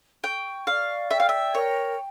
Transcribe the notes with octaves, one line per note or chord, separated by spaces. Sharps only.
G5 C#6
D5 F5
E5 G5
F5
E5
A#4 C#5